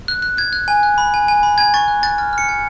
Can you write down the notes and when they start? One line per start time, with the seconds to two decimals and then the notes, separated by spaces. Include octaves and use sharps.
0.08 F#6
0.22 F#6
0.37 F#6 G#6
0.53 F#6
0.68 G#5
0.83 F#6
0.98 B5
1.14 G#5
1.28 G#5
1.43 B5
1.58 G#5 G#6
1.74 C#6 A6
1.88 F#6
2.03 F#6 A6
2.18 F6 A6
2.33 F6 C#7
2.49 G#5